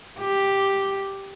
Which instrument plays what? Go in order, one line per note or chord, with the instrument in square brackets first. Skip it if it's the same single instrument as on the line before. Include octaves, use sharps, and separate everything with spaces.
[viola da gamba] G4